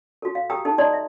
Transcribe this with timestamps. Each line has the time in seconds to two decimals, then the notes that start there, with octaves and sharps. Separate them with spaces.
0.22 F#4 A4
0.35 F5
0.50 G4 A4 G5 A#5 D#6 E6
0.65 D#4 A4
0.78 D5 D#5 A5 A#5 C6 D#6
0.93 E5